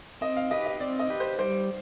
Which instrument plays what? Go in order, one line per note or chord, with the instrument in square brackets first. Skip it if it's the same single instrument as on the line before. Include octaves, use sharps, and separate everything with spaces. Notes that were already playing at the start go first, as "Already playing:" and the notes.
[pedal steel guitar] C4 [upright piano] D#5
[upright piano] F5
[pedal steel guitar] G4 B4 [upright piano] D#5
[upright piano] D#5
[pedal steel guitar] C4 [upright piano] D5
[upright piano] D#5
[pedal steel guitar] G4 B4
[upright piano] C5
[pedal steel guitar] G3 [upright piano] C5